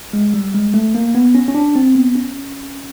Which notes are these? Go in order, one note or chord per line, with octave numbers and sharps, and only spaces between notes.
G#3
G3
G#3
A3
A#3
B3
C#4
C#4
D4
C4
B3
C#4